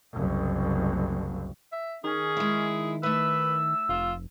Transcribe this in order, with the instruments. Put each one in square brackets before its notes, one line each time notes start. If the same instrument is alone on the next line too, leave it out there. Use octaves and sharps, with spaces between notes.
[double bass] F#1 C2
[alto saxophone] E5
[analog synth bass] D#3 [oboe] C#4 [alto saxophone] G#4
[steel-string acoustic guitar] G#3 E4
[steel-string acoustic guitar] A3 E5 [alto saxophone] B4 [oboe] E6
[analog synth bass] F1 [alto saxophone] F4